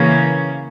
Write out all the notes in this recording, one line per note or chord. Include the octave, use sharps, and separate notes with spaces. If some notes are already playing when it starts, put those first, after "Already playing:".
Already playing: C#3 E3 A#3 C#4